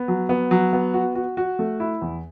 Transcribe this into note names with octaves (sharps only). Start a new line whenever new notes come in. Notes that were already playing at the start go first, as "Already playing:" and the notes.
Already playing: B3
F#3
B3
F#3
B3
F#4
F#4
F#4
A3
E4
E2